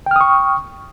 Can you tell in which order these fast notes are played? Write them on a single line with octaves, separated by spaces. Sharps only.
G5 F6 D#6 C#6